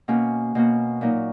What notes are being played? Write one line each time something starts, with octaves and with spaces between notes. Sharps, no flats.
B2 A#3 C#4 F#4
B2 A#3 C#4 F#4
A#2 F#3 A#3 D#4